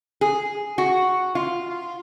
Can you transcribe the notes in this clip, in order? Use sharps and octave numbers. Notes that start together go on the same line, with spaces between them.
G#4
F#4
F4